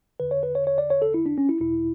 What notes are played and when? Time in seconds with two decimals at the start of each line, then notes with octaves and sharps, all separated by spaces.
0.20 E2 D3 B4
0.31 C#5
0.43 B4
0.55 C#5
0.67 C#5
0.78 D5
0.90 C#5
1.02 A4
1.14 E4
1.26 D4
1.38 C#4
1.49 E4
1.61 E2 B2 E4